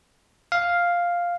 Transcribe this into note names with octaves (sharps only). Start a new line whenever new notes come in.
F5